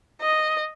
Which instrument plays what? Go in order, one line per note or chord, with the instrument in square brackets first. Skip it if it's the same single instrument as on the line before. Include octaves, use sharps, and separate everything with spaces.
[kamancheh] D#5